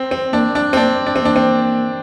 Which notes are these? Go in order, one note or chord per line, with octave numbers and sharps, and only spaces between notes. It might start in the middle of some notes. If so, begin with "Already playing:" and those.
Already playing: C4
C4
A#3 D4
D4
C4
A#3 D4
D4
C4
A#3 D4
C4